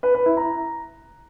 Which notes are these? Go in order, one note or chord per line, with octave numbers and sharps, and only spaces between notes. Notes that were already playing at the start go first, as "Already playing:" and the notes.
B4
B4
E4
A#5